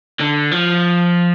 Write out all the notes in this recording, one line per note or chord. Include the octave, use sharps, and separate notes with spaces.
D3
F3